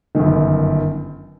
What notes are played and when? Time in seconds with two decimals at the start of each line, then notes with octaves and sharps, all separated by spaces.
0.15 G1 F#2 D#3